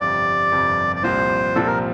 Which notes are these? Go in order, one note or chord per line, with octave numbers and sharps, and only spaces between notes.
G1 F2 C3 G3 D5
G1 F2 C3 G3
D5
C2 A#2 F3 C4 C5
C2 A#2 F3 C4 A4
A#4